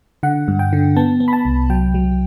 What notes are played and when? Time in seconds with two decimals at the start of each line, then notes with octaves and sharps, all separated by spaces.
0.23 D3 F#5
0.48 G2
0.59 G5
0.73 D3
0.96 B3 A5
1.20 B3
1.28 B5
1.33 A5
1.45 C2
1.70 F#3 G5
1.94 F#3